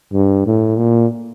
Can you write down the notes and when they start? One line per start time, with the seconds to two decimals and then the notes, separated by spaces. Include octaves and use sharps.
0.13 G2
0.46 A2
0.78 A#2